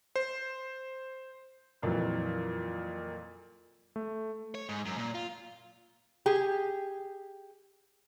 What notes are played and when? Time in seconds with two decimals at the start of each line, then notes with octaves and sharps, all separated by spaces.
0.16 C5
1.82 F2 A#2 E3 F#3
3.96 A3
4.55 C#5
4.69 G#2
4.86 F#2
4.98 A#2
5.15 F4
6.26 G4 G#4